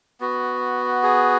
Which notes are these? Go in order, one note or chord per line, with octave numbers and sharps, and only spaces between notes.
B3 F#4
G#4